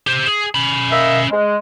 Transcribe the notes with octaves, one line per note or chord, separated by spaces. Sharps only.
G4 C5
G#4
C#4 B5
A#3 D#5 E5
G#3